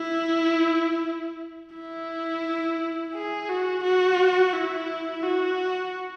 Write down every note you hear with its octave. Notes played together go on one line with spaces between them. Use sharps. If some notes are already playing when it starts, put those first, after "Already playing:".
Already playing: E4
E4
G#4
F#4
F#4
E4
F#4